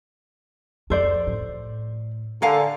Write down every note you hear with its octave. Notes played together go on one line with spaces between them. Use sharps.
F2 A4 C5 D5
A2
D3 A#4 F5 G#5 C#6